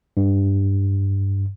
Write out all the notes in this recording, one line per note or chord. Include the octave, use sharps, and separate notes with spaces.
G2